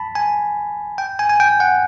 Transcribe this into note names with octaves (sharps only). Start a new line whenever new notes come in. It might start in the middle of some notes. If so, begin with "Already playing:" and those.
Already playing: A5 B5
G#5
G5
G#5
G#5
G5
F#5